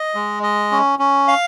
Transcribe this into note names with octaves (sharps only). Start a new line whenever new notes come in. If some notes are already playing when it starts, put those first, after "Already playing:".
Already playing: D#5
G#3
D#5
C#4
C#4
F5